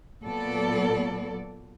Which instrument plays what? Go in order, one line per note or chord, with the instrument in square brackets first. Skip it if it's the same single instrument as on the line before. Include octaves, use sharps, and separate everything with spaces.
[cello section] A#2 F#3 B3 A4 D5